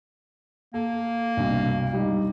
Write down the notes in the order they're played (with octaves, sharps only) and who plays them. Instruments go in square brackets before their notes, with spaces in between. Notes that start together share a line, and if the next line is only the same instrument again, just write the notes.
[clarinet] A#3 [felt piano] A4
[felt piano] C2 G2 B2
G3 D#4